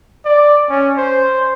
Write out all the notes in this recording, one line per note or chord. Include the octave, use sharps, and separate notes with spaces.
D5
C#4
C5